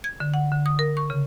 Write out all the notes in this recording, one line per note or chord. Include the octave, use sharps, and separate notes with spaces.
G#6
D3
F#5
D3
D#6
A#4
C#6
C#3